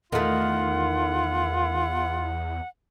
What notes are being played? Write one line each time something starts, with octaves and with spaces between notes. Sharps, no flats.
E2 D#3 A3 F4 F#5